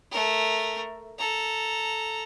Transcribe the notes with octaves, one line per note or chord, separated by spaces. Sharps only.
A3 A#4
A4 A#5